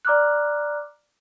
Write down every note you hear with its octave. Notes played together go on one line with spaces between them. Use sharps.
D5 A#5 D6 F6 F#6